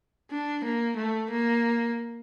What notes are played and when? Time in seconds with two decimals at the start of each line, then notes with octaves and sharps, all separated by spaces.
0.31 D4
0.64 A#3
0.96 A3
1.30 A#3